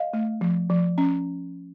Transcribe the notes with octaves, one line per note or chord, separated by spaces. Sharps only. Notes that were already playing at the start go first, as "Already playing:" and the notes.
Already playing: D#5 F5
A3
F3
F3
C#4